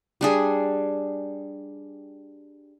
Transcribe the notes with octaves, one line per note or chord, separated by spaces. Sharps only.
G3 D4 G#4